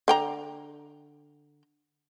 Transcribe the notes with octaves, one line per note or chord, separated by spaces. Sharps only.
D3 G5 A#5